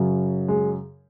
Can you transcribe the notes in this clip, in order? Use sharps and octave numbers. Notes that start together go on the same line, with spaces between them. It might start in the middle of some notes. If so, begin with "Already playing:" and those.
Already playing: F#2 C#3 F#3
G#3